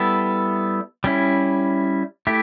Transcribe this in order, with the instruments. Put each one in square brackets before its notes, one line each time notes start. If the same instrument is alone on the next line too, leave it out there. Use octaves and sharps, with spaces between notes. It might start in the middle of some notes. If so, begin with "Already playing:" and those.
Already playing: [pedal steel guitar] G3 B3 E4 A4
G3 C#4 E4
A3 E4 G4